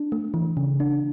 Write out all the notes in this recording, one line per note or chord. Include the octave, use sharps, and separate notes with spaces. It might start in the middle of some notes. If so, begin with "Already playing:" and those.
Already playing: D4
A3
E3
C#3
D4